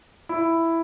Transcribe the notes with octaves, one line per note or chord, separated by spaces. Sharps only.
E4